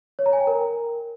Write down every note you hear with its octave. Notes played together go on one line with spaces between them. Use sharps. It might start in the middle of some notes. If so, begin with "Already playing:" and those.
C#5
A#5
G#5
G5
A#4